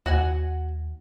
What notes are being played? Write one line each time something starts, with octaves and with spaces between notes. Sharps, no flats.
D#2 F#4 F#5 G#5